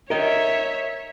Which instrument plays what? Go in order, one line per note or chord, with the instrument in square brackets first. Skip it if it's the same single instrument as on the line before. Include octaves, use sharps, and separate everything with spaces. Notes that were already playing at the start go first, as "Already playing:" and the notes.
[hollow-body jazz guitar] A#4 D#5 [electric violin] C#5 E5